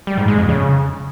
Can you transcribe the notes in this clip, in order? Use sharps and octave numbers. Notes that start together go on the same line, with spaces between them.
G3
G#2
G#3
F2
C#3